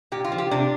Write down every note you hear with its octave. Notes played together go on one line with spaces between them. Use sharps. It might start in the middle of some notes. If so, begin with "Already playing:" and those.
A#2 G4
F4
F3
G4
C3 D4